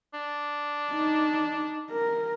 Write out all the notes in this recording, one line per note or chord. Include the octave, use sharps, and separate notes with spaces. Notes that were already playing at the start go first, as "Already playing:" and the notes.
D4
D#4
A#4